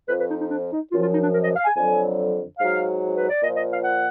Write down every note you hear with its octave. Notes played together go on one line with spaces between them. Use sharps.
F2 F3 B4
B4
D#4
D#4
D4
D#4
F#2 F3 F4
F4
D#4
D4
A#4
D#5
F5
G#5
F2 D3 F#3 G#5
G#2 F#3 F5
B4
D5
A#2 F3 D#5
D#5
F5
F#5